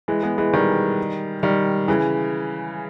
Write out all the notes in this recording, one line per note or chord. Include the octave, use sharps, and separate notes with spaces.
E3 G#3
G#3 B3
E3 G#3
D#3 G3
D#3 G3
C#3 E3